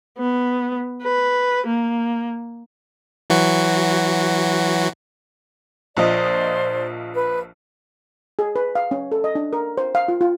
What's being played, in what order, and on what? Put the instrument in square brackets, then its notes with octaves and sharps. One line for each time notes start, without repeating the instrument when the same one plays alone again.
[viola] B3
B4
A#3
[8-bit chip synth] E3 F#3 F#4
[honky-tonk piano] A#1 F3 D#5 [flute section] C5 D5
[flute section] B4
[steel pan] G#4
B4
F5
C#4
A4
D#5
D4
A#4
C5
F5
F4
F4